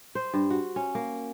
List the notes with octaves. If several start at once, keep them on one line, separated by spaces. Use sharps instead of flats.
C5
G2
F#4
C#4
A#3